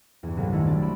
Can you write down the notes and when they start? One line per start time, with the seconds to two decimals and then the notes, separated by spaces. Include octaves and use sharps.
0.23 E2 G2
0.37 C2 A2 F#3 G3
0.52 D#3 G#3 A3 E4
0.66 D4 F#4 D5
0.82 B5 D7 E7